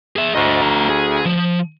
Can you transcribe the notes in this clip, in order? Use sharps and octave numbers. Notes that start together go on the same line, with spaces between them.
G#4 E5
D2 C5 D#5
A3 A#5
G#4
F3